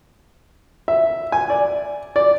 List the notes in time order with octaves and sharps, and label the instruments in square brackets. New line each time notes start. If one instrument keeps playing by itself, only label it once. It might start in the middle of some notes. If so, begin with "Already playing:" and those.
[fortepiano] E5
G#5
D5
D5